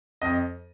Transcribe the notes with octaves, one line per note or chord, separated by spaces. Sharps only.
F2 D#5